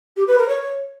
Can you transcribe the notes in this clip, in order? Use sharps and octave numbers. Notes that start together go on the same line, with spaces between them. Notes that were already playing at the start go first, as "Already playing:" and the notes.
G4
B4
A#4
C#5